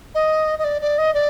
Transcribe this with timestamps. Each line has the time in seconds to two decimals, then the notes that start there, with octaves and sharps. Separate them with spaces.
0.15 D#5
0.59 D#5
0.64 D5
0.82 D5
0.98 D#5
1.14 D5